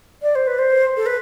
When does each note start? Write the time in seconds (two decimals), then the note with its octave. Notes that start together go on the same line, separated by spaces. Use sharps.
0.22 D5
0.35 C5
0.47 B4
0.59 C5
0.97 A4
1.06 B4